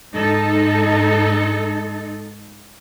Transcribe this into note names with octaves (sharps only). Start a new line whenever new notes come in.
G#2 G#3 D#4 A4